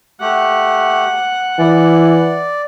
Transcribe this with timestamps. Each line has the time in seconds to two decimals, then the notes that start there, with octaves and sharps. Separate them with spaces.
0.21 A3 G4 F#5
1.59 E3 D5